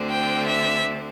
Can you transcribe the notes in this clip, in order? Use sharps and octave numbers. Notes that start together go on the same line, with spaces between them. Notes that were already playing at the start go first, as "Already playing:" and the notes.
Already playing: D2 D3 C4
G5
E5